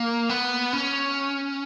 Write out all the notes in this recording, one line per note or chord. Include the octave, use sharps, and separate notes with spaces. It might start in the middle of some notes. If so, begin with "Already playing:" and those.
Already playing: A#3
B3
C#4